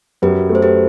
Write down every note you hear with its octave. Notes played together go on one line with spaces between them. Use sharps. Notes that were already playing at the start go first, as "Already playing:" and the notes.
F#2 G4 B4
A3
C5
G4 B4